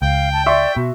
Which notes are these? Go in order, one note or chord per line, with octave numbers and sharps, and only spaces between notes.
C#2 F5 G5
A5
D5 E5 C6 C#6
B2 F#4